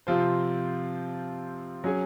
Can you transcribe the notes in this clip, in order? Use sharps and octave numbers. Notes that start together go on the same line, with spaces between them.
C3 F3 C4 F4 C5
F#3 C#4 G#4